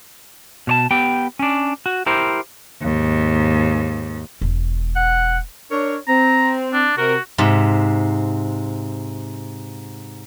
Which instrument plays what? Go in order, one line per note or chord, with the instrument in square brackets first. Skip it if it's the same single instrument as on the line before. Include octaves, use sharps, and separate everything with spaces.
[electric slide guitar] B2 C#5 A5
B3 G4 G5
C#4 D4
F#4
E4 G4 A#4 C5
[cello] D#2 G#2
[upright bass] E1
[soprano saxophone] F#5
[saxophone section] D4 A#4 C#5
[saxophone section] C4 [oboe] A#5
[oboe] D4
[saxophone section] C3 A#4 [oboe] F#4
[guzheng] G#2 C3